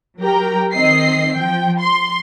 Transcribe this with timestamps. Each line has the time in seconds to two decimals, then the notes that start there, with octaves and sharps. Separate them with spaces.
0.20 F#3 G4 A#4 G5 A#5
0.73 D#3 C4 D#5 C7
1.35 F3 G5
1.80 C6